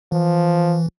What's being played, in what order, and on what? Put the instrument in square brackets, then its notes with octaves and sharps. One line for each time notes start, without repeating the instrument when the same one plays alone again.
[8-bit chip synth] E3 [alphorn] F3